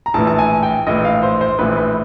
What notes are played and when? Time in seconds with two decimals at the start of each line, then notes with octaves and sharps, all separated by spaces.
0.06 A#5
0.14 A#1 A2 E3 A5
0.27 A5
0.39 G#5
0.63 G5
0.87 A#1 A2 E3 D#5
1.05 F5
1.23 C5
1.41 C5
1.59 A#1 A2 E3 B4
1.77 B4